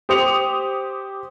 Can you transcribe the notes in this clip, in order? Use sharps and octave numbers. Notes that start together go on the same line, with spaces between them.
G4 C5 D#6 C#7 F7